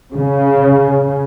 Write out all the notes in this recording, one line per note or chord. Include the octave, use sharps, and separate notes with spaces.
C#3